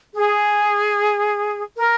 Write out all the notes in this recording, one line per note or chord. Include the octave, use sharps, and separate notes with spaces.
G#4
A#4